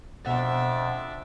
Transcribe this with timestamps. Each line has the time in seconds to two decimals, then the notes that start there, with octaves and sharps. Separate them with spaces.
0.25 F2 B2 D4 E5 F#5 A6